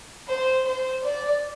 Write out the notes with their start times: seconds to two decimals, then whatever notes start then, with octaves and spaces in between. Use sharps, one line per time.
0.28 C5
0.66 C5
1.03 D5